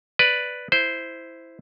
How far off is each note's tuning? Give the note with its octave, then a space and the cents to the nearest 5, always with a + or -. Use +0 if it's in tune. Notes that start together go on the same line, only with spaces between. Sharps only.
B4 +0 D5 +0
E4 +0 C5 -5